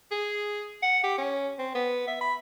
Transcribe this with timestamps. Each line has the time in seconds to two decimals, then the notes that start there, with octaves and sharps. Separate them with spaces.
0.12 G#4
0.83 F#5
1.03 G4
1.18 C#4
1.59 C4
1.75 B3
2.08 E5
2.21 B5